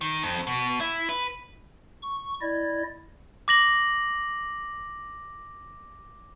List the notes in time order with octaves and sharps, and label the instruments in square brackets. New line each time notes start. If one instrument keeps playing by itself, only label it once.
[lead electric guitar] D#3
F2
B2
E4
B4
[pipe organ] C#6
E4 D5 D#5 G#6
[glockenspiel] D6 A#6 F#7